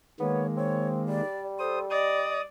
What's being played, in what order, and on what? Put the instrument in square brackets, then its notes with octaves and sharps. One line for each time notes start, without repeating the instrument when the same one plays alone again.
[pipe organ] D#3 G#3 A#3 [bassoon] B3 [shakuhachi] C#5
[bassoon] C4 [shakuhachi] C#5
[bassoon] G3 [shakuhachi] D5
[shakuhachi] A4 [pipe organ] C5 D#6
[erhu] D5 [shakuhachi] D#5 [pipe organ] D#6